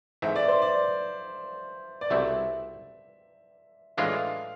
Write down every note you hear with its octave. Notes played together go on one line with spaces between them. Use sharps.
G#2 E3 A3 C4 E5
D5
C5
D5
D5
C2 B2 A3 C4 E4 E5
A2 E3 G#3 D4 F4 F5